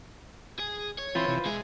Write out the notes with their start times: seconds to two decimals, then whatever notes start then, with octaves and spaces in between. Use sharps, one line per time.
0.59 G#4
0.99 C#5
1.15 E3 C4 F4 B4 C5
1.28 C3 E3
1.46 B2 G#3 E5